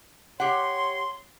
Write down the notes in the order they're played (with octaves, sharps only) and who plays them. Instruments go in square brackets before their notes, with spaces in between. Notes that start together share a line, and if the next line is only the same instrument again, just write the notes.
[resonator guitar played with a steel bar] G4 F#5 [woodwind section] C#5 C6